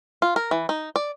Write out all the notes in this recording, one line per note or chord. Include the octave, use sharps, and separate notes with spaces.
F4
A#4
E3
D#4
D5